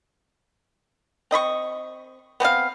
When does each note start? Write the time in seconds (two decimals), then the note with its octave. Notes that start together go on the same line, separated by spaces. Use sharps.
1.31 C4 D#5 B5 C#6
2.40 B3 C4 A#4 F5